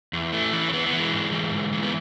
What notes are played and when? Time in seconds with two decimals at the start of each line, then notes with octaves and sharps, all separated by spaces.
0.13 E2
0.33 E3 A3
0.53 E3
0.68 C#4
0.73 E3 B3
0.86 B3
0.93 E3
0.99 G#3
1.13 G#2
1.32 E3
1.52 G#2
1.72 E3
1.83 B3